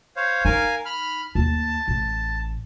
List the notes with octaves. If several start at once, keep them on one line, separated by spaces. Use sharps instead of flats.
C5 C#5 F5
D#4 A#4 F5 G#5
B5 F6
D#2 A5
A1